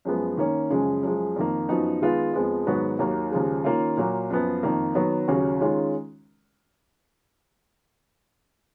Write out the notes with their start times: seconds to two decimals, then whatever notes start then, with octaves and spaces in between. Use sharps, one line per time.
0.05 F#2 F3 G#3 B3
0.37 D#3 A#3 C#4
0.70 F#2 C#3 F3 G#3
1.03 F#2 F3 G#3
1.36 F2 D#3 A#3
1.69 F#2 F3 B3 D#4 F#4
2.02 D#3 G#3 B3 F4
2.33 F2 F3 G#3 B3
2.67 G#2 D#3 F#3 B3 F#4
2.99 D#2 D#3 F#3 A#3
3.31 D#2 C#3 F3 G#3
3.64 D#3 A#3 C#4 F4
3.97 A#2 F#3 A#3
4.30 F#2 F3 B3
4.63 F2 D#3 A#3
4.95 D#3 F#3 B3
5.28 D#2 C#3 F#3 C#4 F#4
5.61 D#3 G#3 C#4 F4